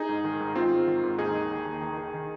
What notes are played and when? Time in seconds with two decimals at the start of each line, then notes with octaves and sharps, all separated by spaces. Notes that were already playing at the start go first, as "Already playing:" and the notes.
Already playing: D#4 G#4
0.09 G#2
0.24 D#3
0.40 G#2
0.55 G#2 C4 F4
0.72 G#2
0.87 D#3
1.03 G#2
1.18 D#2 D#4 G#4
1.34 D#3
1.51 D#2
1.66 D#2
1.82 D#3
1.97 D#3
2.14 D#3